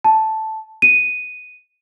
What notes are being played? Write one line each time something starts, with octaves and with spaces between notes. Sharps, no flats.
A5
D#7